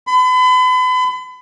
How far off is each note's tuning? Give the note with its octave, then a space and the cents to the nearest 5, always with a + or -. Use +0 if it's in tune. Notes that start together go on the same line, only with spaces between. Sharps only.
B5 +40